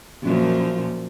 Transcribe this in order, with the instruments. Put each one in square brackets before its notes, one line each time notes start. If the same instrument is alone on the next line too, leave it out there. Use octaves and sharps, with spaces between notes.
[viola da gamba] F#2 A#2 F3